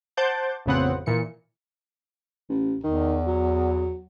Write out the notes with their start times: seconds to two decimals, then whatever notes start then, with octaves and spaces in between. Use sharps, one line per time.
0.17 C5 F#5 A5 D6 G6 A6
0.66 A1 F2 C#3 B3 C4 F#5
1.06 A#2 E3 C#7
2.49 A1
2.83 E2 D#3
3.27 F#3